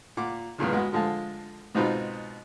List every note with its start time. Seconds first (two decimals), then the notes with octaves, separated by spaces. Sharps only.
0.17 A#2 F#5 D6
0.58 E2 G2 A#2 C#3
0.72 G#3 B3 F#4
0.92 D3 F3 G#3 F5 A5
1.75 G#2 B2 C4 D#4 F4 B5